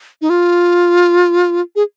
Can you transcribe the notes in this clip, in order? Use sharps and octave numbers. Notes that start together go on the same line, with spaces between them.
D#4
F4
G#4